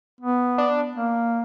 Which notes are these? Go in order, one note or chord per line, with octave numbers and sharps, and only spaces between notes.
B3
D4
A#3